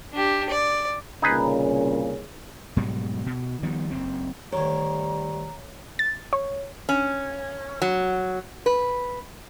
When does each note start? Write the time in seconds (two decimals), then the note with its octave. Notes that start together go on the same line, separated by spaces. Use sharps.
0.13 D4 G4
0.50 D5
1.22 C2 A#2 C#3 D#4 G#4 B4
2.76 G#2 B2 F#3 G3
3.26 B2
3.63 D#3 F3 G3 B3
3.91 F#1 C4
4.53 D2 D#3 G3 C#5 A#5
5.99 A6
6.33 C#5
6.89 C#4
7.82 F#3
8.66 B4